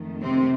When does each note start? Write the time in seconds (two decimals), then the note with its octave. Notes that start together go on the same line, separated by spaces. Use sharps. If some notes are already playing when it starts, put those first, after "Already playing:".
Already playing: F2 D#3 A3
0.22 C3 C4